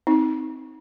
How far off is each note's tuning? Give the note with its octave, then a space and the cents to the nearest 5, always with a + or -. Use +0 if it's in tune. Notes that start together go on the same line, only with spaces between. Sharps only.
C4 +0 D#4 +25